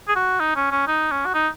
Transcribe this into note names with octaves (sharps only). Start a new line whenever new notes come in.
G#4
F#4
D#4
C#4
C#4
D#4
C#4
F#4
D#4